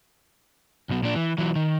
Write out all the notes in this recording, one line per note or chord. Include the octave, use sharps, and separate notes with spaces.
B1 B2
A#2 D4
E3
E3 F#3
D#3